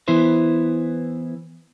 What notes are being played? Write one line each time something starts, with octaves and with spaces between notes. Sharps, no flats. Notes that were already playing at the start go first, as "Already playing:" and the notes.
E3 B3 E4 B4 C5